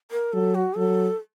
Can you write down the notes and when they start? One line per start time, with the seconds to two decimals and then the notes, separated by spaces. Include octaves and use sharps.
0.11 A#4
0.33 F#3 A4
0.55 F#4
0.77 F#3 A4